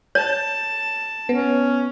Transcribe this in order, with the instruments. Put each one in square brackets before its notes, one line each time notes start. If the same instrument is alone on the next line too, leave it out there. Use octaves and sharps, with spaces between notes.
[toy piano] C#5 [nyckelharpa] A5
[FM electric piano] B3 [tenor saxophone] C#4